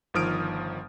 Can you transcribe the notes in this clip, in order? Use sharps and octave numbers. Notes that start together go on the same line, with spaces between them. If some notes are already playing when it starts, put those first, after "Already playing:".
G1 D#3 F3 D#6 F6 D7